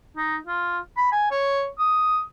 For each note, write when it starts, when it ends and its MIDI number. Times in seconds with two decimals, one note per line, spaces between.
0.17 0.38 63
0.47 0.79 65
0.97 1.10 83
1.12 1.26 80
1.31 1.67 73
1.79 2.21 87